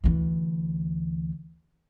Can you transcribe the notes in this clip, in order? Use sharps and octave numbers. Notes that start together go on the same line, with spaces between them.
D2 E3